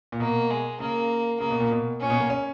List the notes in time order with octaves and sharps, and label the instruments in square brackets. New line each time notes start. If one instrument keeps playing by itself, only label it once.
[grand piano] A#2
[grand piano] B2 [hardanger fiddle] A#3
[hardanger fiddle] G#3
[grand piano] C#3 [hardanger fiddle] A#3
[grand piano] C#3 [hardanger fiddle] A#3
[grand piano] B2
A#2
B2
[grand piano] A#2 [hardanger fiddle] C#4
[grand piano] B2
A#3
C#4